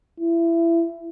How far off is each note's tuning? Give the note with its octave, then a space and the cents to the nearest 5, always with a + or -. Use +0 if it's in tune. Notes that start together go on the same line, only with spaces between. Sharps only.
E4 +25